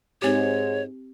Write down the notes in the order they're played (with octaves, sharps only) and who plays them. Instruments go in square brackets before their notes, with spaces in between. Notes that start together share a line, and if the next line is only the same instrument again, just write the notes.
[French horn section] G#2 [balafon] C4 G4 [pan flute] C#5